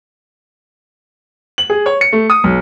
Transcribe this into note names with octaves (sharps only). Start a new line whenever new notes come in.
F#7
G#4
C#5
C#7
A3
D#6
B1